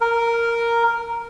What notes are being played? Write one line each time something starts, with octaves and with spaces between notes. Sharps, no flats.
A#4